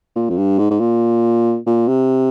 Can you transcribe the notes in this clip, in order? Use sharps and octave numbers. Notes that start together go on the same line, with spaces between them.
A#2
F2
G2
G#2
G#2
A#2
A#2
C3